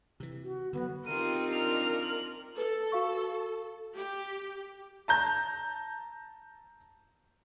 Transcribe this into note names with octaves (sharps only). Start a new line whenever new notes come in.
C3 E3
F#4
D3 D#3 F#3 B3
C4 D#4 F4 G4 A#4 D#7
D4 A#4 F7
F#7
A4 B4
F#4 F5 C#6
G4
A5 A#5 G6